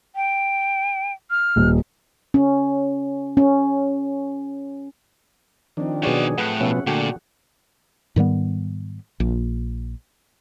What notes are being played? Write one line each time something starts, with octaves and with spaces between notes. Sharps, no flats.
G5
F6
D#1
C#4
C#4
D#3 F3 C4 D4
B2 F#3 F#4 G#4 C#5 D5
A2 B4 F#5
B2 F3 B3 C#4 E5
A#2 D3 A3 F#4 G5 A5
G#2 D#3 G3 B3
A#1